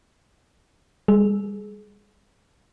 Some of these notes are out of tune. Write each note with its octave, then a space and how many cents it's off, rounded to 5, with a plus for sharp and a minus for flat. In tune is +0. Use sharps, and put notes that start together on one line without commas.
G3 +40 G#4 +30